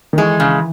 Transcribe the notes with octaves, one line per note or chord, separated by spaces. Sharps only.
D#3
E3 G#3
C#3